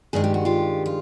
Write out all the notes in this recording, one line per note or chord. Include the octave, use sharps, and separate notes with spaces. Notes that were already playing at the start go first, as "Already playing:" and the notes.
G2 D#3 G#3 G#4
G4
F#4
F4 G4
F4